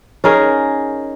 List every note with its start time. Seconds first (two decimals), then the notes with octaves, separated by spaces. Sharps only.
0.24 C#4 D#4 G#4 A#4